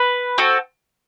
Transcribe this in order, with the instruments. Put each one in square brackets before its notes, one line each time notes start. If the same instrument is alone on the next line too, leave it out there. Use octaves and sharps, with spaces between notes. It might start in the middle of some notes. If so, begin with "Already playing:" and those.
Already playing: [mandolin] B4
C4 F#4 A4